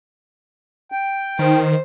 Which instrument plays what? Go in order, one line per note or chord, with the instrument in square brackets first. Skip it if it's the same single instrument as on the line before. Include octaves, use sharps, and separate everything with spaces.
[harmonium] G5
[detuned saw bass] D#3 [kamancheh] C5